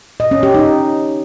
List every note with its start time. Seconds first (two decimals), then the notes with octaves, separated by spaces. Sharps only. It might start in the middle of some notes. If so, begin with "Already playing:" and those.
0.20 D#5
0.31 C#4
0.43 G4
0.55 D#4